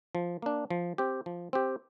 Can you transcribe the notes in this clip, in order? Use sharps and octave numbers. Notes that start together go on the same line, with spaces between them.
F3
A#3 D4
F3
C4 G4
F3
C4 G4